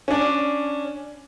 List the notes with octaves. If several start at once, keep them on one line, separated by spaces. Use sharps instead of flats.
C#4 D4